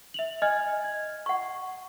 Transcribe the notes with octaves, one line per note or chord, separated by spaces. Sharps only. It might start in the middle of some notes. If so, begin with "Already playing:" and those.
E5 F7 F#7
D#5 G#5 F6 G#6
G#6
F#5 C#6